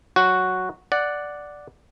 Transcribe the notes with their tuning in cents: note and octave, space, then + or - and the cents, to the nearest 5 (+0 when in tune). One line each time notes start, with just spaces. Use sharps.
F#3 +0 F#4 +0
D5 +0 F#5 +0